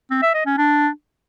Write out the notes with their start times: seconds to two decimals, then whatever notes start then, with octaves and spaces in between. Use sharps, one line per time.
0.10 C4
0.22 E5
0.34 D#5
0.46 C#4
0.57 D4